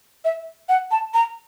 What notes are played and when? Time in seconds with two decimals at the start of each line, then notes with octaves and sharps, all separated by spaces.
0.25 E5
0.69 F#5
0.91 A5
1.14 A#5